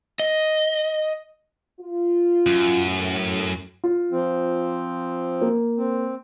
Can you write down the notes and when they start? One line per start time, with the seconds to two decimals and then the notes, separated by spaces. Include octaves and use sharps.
0.19 D#5
1.80 F4
2.47 F#2
2.86 A2
3.84 F4
4.11 F3 C4
5.41 A#3
5.77 C4